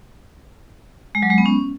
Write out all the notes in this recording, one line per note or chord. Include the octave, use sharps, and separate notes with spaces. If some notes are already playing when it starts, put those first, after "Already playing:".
G#3
F#3
G#3
B3
C#4